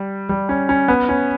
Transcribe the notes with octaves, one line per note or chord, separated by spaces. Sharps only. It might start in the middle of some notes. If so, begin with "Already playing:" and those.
Already playing: G3
G3
C#4
C#4
B3
C#4